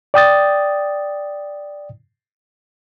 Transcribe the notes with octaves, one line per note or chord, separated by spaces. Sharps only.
D5 G5 D#6 A6